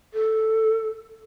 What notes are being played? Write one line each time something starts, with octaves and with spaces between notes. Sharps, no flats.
A4